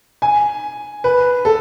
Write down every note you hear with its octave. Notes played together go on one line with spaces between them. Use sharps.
G#5
B4
A4